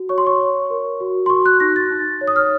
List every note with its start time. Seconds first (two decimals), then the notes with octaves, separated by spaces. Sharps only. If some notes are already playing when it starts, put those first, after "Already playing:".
Already playing: F#4
0.09 C#5 C#6
0.18 C6
0.27 C#6
0.40 C#5
0.70 A#4
1.00 F#4
1.26 C6
1.30 F#4 C#6
1.46 F#6
1.60 D#4 A#6
1.76 A6
1.91 D#4
2.21 C#5
2.28 D#6
2.36 F6